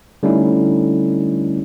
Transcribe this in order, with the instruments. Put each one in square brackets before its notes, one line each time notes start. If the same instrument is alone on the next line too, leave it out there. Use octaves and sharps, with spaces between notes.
[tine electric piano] D3 G3 A3 C#4 D#4 E4